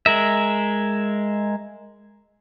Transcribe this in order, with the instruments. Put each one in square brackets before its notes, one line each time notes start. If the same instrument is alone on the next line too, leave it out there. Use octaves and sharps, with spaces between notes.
[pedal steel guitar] G#3 A#4 E5